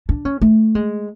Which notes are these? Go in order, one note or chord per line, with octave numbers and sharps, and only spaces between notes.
D4
C#4
A3
G#3